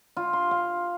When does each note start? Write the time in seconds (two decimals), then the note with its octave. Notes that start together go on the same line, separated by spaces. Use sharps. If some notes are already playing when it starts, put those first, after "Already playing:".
0.17 F4
0.33 C6
0.51 F5